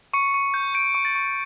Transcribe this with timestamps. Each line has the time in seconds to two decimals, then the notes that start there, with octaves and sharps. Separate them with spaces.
0.13 C#6 C#7
0.34 C#6
0.54 G6
0.74 G6 D7
0.95 C#6
1.05 A6
1.15 C#6